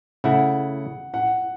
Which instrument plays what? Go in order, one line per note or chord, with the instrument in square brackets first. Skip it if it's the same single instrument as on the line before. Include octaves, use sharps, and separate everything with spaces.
[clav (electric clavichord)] C#3 A3 E4 [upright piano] F#5
[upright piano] F#5